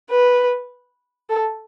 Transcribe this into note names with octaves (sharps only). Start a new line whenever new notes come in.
B4
A4